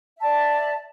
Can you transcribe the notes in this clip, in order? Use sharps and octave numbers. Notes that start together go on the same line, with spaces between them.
D5 E5 A5